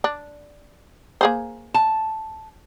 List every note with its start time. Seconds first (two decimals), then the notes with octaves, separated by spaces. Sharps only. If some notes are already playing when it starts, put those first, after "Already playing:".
0.04 D4
1.21 A#3 G#4 C5
1.74 A5